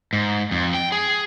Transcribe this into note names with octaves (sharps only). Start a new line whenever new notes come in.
G#2
F2
G5
G#4